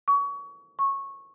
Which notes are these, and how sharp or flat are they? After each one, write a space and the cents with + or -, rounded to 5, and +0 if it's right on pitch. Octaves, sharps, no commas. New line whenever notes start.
C#6 +30
C#6 -15